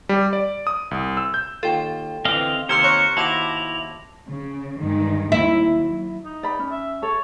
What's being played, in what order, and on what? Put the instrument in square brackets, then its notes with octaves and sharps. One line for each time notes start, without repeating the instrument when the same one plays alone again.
[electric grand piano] G3
D5
D#6
C2
E6
G6
[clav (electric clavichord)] D#2 F4 [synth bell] A4 G5
[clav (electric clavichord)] D3 E3 [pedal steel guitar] C4 D#5 F5 [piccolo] F7
[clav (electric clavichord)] D#2 C3 [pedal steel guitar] A#4 C5 [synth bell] C6 E6 G#6 [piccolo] C#7
[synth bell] C#5 C#6 F#6
[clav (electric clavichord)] D#2 F#4 C5 [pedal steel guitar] E4 [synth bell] A5 D6 A#6 [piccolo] F7
[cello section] C#3
G2 D#3 G#3
[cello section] D#2 [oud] E4
[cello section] F#3
[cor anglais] D#4
[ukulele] D5 B5
C#4
[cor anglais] E5
[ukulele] A4 [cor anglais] C#5